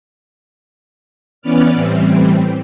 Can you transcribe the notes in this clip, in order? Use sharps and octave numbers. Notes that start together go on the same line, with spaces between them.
E3 B3 C#4 B4 D5 F6
A2 E3 G3 C4